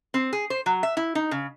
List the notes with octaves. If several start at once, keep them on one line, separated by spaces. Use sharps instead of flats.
C4
G#4
C5
F#3
E5
E4
D#4
C#3